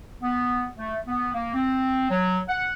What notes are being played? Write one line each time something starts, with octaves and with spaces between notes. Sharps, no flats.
B3
A3
B3
A#3
C4
F#3
F#5